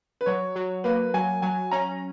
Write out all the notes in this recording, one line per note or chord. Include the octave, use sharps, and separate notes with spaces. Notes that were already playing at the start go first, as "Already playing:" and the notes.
B4
F#3 C#5
F#3
A#3 B4
F#3 G#5
F#3 G#5
C#4 A#5